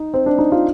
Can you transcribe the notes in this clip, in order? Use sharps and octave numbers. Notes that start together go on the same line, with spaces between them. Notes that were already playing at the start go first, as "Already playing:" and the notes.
Already playing: D#4
C4
D4
D#4
F4